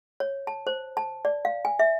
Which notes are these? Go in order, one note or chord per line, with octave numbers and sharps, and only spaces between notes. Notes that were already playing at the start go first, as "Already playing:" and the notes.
C#5
A5
C5
A5
D5
F5
G#5
E5